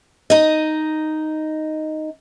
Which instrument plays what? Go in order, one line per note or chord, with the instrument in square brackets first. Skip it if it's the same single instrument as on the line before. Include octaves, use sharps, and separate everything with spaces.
[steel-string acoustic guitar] D#4 D#5